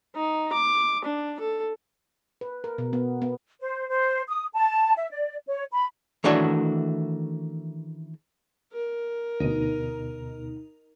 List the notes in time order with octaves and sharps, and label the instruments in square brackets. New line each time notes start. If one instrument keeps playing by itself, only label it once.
[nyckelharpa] D#4
D6
D4
A4
[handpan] B4
A#4
B2
B3
B3
[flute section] C5
C5
D#6
A5
E5
D5
C#5
B5
[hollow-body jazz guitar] D#3 E3 A3 D4 F#4 C#5
[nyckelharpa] A#4
[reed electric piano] D2 B2 [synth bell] D#4